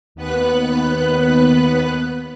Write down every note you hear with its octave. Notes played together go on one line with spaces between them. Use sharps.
D#2 B3 B4 F#6